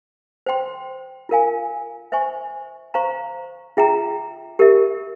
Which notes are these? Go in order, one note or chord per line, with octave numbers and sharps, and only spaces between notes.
C5 G5 C6
F4 A#4 F5 G#5
C5 E5 G#5 C#6
C5 F5 A#5 C#6
F4 G#4 E5 G5 A#5
G4 A#4 E5